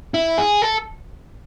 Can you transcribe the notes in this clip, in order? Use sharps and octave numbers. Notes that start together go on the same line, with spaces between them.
E4
G#4
A4